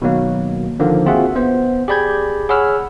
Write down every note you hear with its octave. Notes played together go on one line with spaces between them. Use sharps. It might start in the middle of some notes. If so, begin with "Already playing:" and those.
B2 D#3 F#3 A#3
D3 D#3 F3 A#3
C4 F4 F#4 G#4 E5 F#5
B3 C5
G4 G#4 D5 B5 G6 G#6
G#4 C#5 F#5 B5 E6 F6